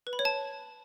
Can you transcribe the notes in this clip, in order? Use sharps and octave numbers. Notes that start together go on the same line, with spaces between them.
B4
B5
C#5
A5